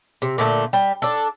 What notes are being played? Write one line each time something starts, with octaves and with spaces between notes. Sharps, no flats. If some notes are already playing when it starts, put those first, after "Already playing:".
C3
A#2 D3 A3
G3
D4 A4